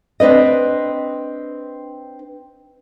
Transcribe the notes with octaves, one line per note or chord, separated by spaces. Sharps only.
C4 D4 B4 D#5